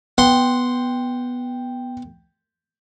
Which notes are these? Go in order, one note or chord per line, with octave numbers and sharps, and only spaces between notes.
B3 F#5 G5 C6